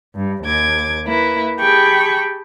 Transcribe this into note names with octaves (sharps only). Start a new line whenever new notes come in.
G2
D#2 D6 G#6
A#3 E4 B4
G4 G#4 G5 A5 B5 C#6